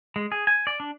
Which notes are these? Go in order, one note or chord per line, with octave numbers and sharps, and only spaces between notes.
G#3
G#4
G#5
D5
D4